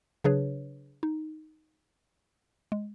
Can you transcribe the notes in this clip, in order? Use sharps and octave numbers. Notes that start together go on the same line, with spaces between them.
C#3 F#3 D4 G#4 B4 C#5
D#4
G#3